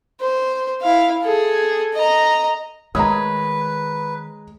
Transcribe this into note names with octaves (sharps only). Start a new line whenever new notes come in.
C5
E4 F5
G#4 A4
D#5 A#5
D#3 G#3 B4 C#5 A#5 D#6